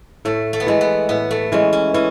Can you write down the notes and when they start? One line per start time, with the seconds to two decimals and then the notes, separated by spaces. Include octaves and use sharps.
0.25 A2 A3
0.53 A3
0.60 B3
0.67 E3 G#3 A3
0.81 B3
1.09 A2 B3
1.31 A3
1.52 E3 G#3 C#4
1.73 C#4
1.94 E3 C#4